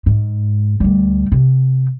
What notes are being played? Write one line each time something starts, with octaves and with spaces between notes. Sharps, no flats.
G#2
D2 G3
C3